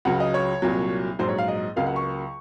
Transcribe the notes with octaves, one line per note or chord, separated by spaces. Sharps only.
C#2 C#3 F#3 F#5
D#5
C#5
C2 A#2 F#3
A#1 G#2 F#3 C5
C#5
F5
D#5
C#2 C#3 F#3 A#3 F5
F#5
C#6